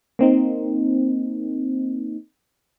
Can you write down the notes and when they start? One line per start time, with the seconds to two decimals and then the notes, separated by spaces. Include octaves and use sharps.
0.19 A#3 C4 D#4